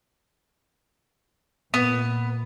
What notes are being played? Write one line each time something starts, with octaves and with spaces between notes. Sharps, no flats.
A#2 B3